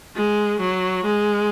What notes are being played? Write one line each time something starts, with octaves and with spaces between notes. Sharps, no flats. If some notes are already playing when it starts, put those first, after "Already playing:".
G#3
F#3
G#3